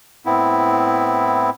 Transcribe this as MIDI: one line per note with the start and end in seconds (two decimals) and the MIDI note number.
0.26 1.50 45
0.26 1.50 59
0.26 1.50 60
0.26 1.50 64